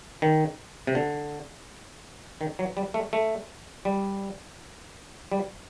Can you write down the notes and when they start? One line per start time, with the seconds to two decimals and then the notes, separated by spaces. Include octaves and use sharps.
0.22 D#3
0.87 C3
0.95 D3
2.41 D#3
2.59 F#3
2.77 G3
2.94 A3
3.13 A3
3.85 G3
5.32 G3